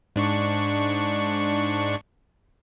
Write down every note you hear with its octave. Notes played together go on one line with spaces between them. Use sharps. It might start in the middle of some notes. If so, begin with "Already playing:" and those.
G#2 D4 C#6